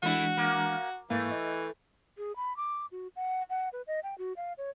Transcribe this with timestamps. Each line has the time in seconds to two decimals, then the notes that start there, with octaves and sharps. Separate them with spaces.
0.03 E3 G#3 A3 D4 E4 F#4
0.37 A#3
1.10 G#2 E3 A3 A#3 F5
1.32 D#5
2.17 G#4
2.36 B5
2.57 D6
2.92 F#4
3.16 F#5
3.50 F#5
3.73 B4
3.87 D#5
4.03 G5
4.18 F#4
4.37 F5
4.58 C#5